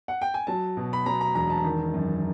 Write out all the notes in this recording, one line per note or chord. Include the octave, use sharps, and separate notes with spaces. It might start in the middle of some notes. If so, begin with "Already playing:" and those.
F#5
G5
G#5
F#3 A5
B2
B5
F#3 A#5
A#5
E1 A#5
A5
D#3
F#2